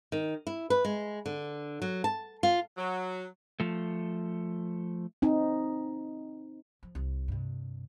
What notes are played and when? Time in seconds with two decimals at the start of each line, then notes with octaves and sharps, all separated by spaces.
0.12 D#3
0.47 E4
0.70 B4
0.85 G#3
1.26 D3
1.82 F#3
2.04 A5
2.43 F4
2.77 F#3
3.60 F3 A3
5.22 C4 D#4
6.83 F3
6.95 C2
7.28 G2 C3